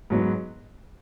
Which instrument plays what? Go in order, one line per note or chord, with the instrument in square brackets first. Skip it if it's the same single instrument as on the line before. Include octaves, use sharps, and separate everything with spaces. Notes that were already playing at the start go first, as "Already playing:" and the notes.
[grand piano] G#2 F#3 B3